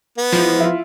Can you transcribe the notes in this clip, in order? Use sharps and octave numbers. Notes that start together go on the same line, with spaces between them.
B3
E3 F3 G#3
E4 F4